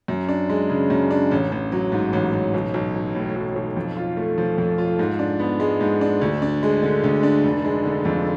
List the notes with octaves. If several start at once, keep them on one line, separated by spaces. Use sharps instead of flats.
F#2
D4
G#3
C#3
F#2
D4
A1
A1
F#3
G#2
A1
A1
B1
B1
F#3
A2
B1
B1
F2
F4
A3
F3
F2
F4
G#2
D4
B3
G#3
G#2
D4
D2
D4
G#3
D3
D2
D4
F1
G#3
D3
F2